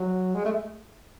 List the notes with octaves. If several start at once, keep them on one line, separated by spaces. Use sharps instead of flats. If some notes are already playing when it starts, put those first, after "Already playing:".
Already playing: F#3
G#3
A3